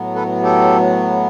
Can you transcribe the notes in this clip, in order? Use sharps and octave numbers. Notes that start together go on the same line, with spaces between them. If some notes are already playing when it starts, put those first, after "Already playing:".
Already playing: A2 F#3 B3
A4 B4
G4 A4